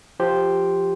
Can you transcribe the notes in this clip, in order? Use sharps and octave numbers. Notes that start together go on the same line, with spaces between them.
F3 G4 C5